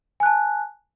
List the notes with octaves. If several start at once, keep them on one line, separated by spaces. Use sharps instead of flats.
G#5 A5 F#6